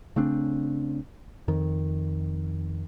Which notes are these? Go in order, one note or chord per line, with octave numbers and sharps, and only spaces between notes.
C#3 A3 C4 D4
F2 D#3